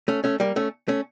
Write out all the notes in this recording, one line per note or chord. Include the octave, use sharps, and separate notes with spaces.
A3 C#4
A3 C#4
G3 A#3
A3 C#4
A3 C#4